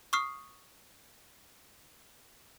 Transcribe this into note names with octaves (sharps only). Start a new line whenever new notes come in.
C#6 D#6 F6 C7